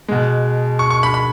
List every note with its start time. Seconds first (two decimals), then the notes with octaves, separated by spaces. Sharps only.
0.08 B2 G#3
0.79 C#6
0.90 C#6
1.03 B5
1.14 B5